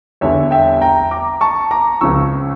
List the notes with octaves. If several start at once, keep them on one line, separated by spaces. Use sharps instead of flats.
E2 D3 G3 C#5 E5
E5 G5
G5 A#5
A#5 D6
A5 C#6
A#5 D6
C#2 C#3 F3 C#6 E6